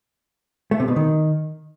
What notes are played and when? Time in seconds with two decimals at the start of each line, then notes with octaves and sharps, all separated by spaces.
0.71 A3
0.80 C3
0.88 B2
0.96 D#3